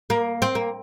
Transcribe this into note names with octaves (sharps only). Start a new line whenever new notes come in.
A#3
C4
A#3